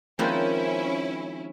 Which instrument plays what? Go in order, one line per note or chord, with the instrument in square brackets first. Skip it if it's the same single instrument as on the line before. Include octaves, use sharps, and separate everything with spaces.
[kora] D#3 F3 C4 [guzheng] G#3 A#3 B4 [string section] C#4 E4